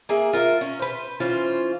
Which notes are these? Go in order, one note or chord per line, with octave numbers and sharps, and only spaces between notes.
A#3 G#4 E5
F4 A#4 D#5 E5
C#4
B4 C5
E3 C#4 F4 C5